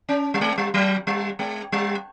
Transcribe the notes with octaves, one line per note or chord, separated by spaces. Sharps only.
C#4
G3
G#3
G3
F#3
G3
G#3
G3